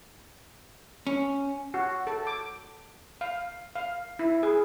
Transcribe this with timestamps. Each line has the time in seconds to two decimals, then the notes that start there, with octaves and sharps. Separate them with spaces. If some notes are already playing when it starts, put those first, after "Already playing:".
1.07 C#4
1.74 F#4
2.07 A4
2.27 D6
3.21 F5
3.75 F5
4.19 E4
4.43 G#4